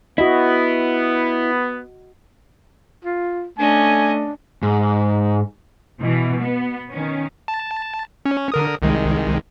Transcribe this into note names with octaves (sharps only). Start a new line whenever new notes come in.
B3 E4 F#4 D#5
F4
A3 C#4 D4 D#5 G#5
G#2
B2 E3
B3
D#3 C#4
A5
C#4
D3 A#4 D#6
C2 D#3 G#3